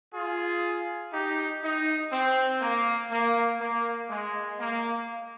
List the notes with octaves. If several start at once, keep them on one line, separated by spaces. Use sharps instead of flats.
F4 G#4
D#4 G4
D#4
C4
A#3
A#3
A#3
G#3
A#3